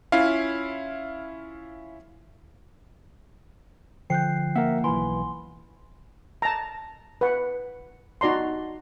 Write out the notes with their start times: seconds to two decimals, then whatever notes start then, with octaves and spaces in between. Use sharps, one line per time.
0.12 C#4 E4 F4 F5
4.10 D3 F3 G5 F#6 G6 C7
4.56 A#3 A#4 E5 F#5
4.84 B1 E3 G#5 B5 C6
6.42 A5 A#5
7.21 B4 F#5
8.21 D#4 F#4 D5 A#5 C6